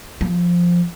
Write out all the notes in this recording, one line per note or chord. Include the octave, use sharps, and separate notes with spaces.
F3